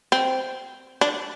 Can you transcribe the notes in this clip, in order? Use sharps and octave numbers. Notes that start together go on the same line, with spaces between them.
C4
D4